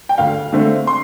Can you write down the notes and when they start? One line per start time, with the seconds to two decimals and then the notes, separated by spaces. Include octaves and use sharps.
0.09 G5
0.18 D2 F5
0.53 D3 A3 C4
0.87 C6